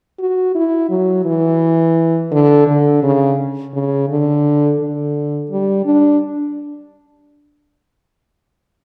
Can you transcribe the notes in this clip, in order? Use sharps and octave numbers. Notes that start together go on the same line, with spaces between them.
F#4
E4
F#3
E3
D3
D3
C#3
C#3
D3
D3
G3
D4